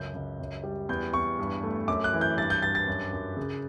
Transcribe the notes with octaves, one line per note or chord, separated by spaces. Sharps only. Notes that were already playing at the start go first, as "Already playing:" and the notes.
Already playing: C#2 F#2 G6
C#2
F#2
G3
E2 G6
E2 C#6
G2
A3
F#2 D6
F#6
E3
G6
G2 A6
G6
G2 A6
A6
F#2
F#2
C#3